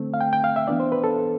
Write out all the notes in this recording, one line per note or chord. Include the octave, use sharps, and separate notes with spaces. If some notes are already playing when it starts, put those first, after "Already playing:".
Already playing: D3 A3 C4
F5
G5
G5
F5
E5
E3 B3 D4 D5
C5
B4
A4